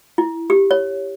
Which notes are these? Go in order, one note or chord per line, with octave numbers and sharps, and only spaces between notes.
E4
G4
C#5